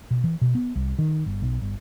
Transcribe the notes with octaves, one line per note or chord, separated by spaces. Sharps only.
B2
E3
B2
B3
C2
D#3
G1
B1
G1